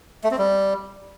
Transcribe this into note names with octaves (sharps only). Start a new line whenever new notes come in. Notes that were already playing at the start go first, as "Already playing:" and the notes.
A3
C4
G3